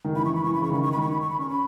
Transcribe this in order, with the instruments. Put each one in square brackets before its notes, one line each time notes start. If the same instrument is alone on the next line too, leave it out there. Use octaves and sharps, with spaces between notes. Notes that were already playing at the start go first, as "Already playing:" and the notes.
[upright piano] D#3
[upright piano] E3 [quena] B5
[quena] C#6
B5
[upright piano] E3 [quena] C#6
[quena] B5
[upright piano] C#3 [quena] C#6
[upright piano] D#3 [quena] B5
[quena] C#6
B5
[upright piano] D#3
[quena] C#6
B5
C#6
B5
[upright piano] C#4 [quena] C#6
[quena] B5